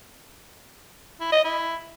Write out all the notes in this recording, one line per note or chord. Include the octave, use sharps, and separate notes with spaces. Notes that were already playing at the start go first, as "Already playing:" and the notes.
E4
D#5
E4